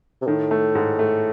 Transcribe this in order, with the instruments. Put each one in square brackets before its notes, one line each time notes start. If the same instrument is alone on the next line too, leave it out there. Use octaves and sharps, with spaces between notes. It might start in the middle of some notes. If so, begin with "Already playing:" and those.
[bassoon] C3
[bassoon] A2 [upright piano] D#3
[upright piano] A3
G#2
A3